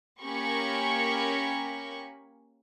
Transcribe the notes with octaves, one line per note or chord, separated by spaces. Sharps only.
A#3 C#4 G4 A#4 B5 C#6